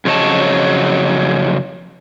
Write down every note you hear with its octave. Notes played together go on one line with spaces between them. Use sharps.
F2 C#3 F#3 C#5 D#5 A5